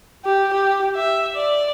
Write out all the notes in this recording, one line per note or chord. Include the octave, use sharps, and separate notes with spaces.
G4
G4
E5
D5